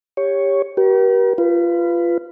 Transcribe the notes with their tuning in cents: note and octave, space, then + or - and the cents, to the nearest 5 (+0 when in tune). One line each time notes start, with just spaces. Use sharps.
G4 +15 C#5 +0
G4 -35 A#4 +45
F4 -20 B4 +10